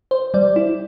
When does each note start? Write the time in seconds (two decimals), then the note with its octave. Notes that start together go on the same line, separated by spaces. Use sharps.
0.11 C5
0.34 G3 D5
0.56 E4